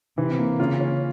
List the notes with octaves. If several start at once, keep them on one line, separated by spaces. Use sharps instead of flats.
C3 E3
A#3
C#3 F4
C#4